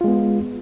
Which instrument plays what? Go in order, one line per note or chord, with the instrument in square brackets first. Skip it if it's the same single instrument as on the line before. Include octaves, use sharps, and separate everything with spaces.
[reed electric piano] F4
G#3
B3